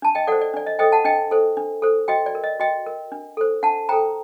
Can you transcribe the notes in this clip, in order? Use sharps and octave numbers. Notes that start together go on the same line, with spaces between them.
D4 A5
D#5 G5
A4 C5 D5 F#5
D5
D4 D5
D#5
A4 C5 D#5 G5
F#5 A5
D4 D#5 G5
A4 C5
D4
A4 C5
F#4 D#5 G5
D5
A#4
D#5
F#4 D#5 G5
A#4
D4
A4 C5
D4 F#5 A5
A4 C5 G5 A#5